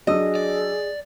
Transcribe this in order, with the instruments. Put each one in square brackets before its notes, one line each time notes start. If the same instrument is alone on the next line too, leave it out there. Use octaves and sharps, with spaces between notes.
[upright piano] F#3 D4 E6 [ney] G#4 [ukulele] D#5
[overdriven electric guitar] D5